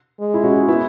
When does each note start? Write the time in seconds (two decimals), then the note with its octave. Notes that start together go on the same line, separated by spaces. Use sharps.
0.20 G#3
0.34 E4
0.44 C#4 F#4
0.68 B3 E4